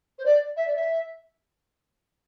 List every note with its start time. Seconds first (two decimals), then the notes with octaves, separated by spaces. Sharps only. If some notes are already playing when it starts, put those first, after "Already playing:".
0.19 C5
0.25 D5
0.57 E5
0.67 D5
0.76 E5